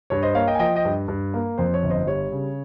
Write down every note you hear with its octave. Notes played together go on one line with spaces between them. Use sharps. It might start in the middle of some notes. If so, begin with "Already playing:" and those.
G2 C#5
C5 D#5
A#3 C#5 F5
D#5 G5
G#5
F3 D#5 G5
D#5 G5
G2
G2
A#3
F2 C5
C#5
G1
C5 D#5
G3 C#5
C#3